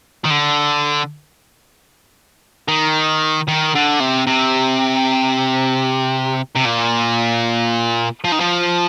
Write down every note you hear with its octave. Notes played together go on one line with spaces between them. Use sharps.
D#3
D3
D#3
D#3
D3
C3
C3
C3
A#2
F3
D#3
F3